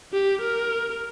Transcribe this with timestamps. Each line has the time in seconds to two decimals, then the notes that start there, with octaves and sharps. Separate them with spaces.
0.13 G4
0.41 A#4